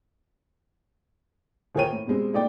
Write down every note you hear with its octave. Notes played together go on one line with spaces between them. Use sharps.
D#1 G#4 A#4 C#5 G5 D#7
A2
B2 G3 G#3 C4
A#2 A3 D#4 D5 G5